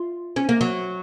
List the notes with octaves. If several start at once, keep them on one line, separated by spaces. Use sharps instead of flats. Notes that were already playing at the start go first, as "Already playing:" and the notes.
Already playing: F4
C#4
A#3
F#3